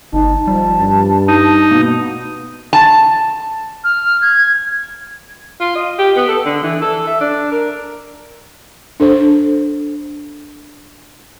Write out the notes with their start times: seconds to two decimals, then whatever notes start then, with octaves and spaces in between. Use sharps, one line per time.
0.13 G1 D#4 A5
0.47 F3 G3
0.79 G2
1.28 D#4
1.71 B2 A#3 B3
2.73 A5
3.84 F6
4.22 G#6
5.61 F4
5.76 D#5
5.98 G4
6.16 B3
6.28 A4
6.45 D3
6.63 E3
6.82 A4
7.07 E5
7.21 D4
7.51 A#4
9.00 D4 A4 C5